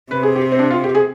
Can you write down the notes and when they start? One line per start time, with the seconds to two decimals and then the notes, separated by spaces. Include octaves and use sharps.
0.11 C3 B4
0.23 G#4
0.36 G4
0.52 C4
0.59 D4
0.70 F4
0.84 G4
0.95 G#4